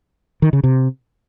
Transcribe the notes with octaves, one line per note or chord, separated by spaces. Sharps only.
D#3
C#3
C3